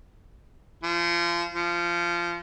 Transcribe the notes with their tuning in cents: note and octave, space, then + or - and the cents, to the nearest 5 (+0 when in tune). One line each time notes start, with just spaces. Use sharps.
F3 -30
F3 -20